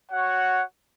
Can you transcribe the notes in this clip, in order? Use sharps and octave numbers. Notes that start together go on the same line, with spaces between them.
F#4 C#5 F#5